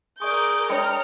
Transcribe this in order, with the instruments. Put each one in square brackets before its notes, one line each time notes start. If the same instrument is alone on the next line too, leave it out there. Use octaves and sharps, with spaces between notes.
[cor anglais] G#4 [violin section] A#4 D6 G6 [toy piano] D5 C#6
[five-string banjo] G#3 D4 C#5 [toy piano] G5 B5 D#6 [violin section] A#5 F6